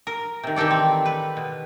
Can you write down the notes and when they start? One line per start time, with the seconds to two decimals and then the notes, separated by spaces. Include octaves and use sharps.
0.07 A#4
0.43 C3 D#3
0.56 D#3 E3 G4 A4 D5
0.71 C4
1.05 B4
1.37 B2